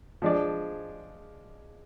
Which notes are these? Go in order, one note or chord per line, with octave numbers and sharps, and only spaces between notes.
F3 G#3 D4 G#4 D5